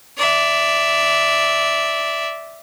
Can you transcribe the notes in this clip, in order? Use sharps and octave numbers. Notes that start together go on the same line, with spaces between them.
D5 E5